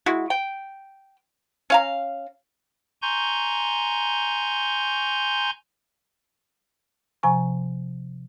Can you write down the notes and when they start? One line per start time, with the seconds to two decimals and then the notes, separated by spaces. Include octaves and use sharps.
0.06 G#3 E4 F#4
0.30 G5
1.70 C#4 F5 A#5
3.02 G#5 A#5 C6 C#6 G6
7.23 C3 F3 G#5 A#5 C#6